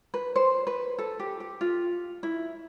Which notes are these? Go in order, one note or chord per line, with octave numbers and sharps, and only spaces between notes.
B4
C5
B4
A4
G4
G4
F4
E4